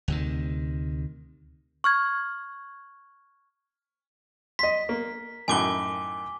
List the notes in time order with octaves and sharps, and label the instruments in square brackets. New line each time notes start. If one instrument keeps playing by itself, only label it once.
[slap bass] D2 C3 D#3
[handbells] C#6 F6 G#6
[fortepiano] D#5 C6 [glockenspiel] B6
[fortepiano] A#3
[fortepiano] F#2 A2 D#3 [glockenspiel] G#5 D6 G7